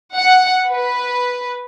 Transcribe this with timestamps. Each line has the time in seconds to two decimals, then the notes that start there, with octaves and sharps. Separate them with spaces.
0.15 F#5
0.73 B4